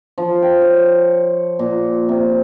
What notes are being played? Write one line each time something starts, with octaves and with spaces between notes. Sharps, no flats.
F3
G5
C#5
A#2
C3